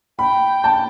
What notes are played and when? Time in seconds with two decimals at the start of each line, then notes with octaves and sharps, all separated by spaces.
0.19 G5 B5
0.64 A5